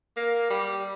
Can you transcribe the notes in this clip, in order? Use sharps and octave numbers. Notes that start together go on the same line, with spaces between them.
A#3
G3